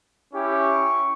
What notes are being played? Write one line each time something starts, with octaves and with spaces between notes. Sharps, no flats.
C#4 E4 G4 C#6